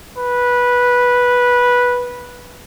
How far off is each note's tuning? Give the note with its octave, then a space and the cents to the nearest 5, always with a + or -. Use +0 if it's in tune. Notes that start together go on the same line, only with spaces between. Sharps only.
B4 -10